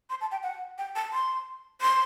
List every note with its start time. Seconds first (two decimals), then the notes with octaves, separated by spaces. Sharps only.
0.10 C6
0.21 A5
0.32 G5
0.43 F#5
0.78 G5
0.95 A5
1.13 C6
1.82 C6